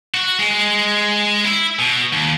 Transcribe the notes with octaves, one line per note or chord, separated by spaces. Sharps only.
F#4
G#3
E4
B2
D#2